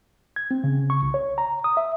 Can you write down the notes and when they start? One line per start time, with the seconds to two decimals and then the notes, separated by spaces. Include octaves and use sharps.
0.36 G#6
0.51 C4
0.64 C#3
0.90 C#6
1.02 C2
1.14 C#5
1.38 A#5
1.64 D#6
1.77 E5